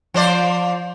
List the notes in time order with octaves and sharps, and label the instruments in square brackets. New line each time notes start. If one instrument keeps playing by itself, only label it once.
[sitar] F3 C5 D5